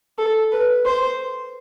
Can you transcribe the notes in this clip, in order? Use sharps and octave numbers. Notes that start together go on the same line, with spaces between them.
A4
B4
C5